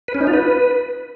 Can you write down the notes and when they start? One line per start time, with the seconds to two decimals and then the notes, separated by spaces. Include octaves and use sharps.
0.08 B4
0.15 C#4
0.21 D#4
0.27 F4
0.33 B4